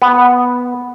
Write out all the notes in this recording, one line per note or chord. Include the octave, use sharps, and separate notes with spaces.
B3